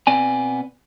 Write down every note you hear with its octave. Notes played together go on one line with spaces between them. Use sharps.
B2 B3 C4 D5 G#5